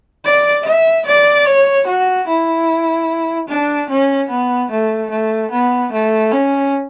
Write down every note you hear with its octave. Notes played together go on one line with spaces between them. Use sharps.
D5
E5
D5
C#5
F#4
E4
D4
C#4
B3
A3
A3
B3
A3
C#4